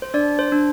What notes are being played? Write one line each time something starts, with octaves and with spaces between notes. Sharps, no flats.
C5
D4 D5
C5
D4